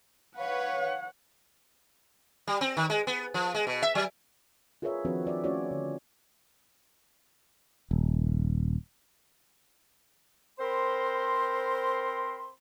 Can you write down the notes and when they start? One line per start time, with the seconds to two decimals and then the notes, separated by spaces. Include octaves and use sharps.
0.37 B4 C#5 F5 F#5
2.47 G3
2.61 C4
2.77 D#3
2.90 G#3
3.07 B3
3.34 F3
3.55 G#3
3.67 B2
3.82 E5
3.95 F#3
4.82 F4 G#4 A#4 B4 C#5 E5
5.05 D#3 F3 C4 D4 F#4 B4
5.25 B4 D5 E5
5.44 A3 C#4 F4 F#4 C#5 D5
5.71 D3
7.91 D#1
10.59 C4 A#4 C5 B5 C6